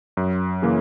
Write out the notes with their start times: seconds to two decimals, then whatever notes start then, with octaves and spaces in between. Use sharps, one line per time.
0.17 F#2
0.62 C#3 E3 A#3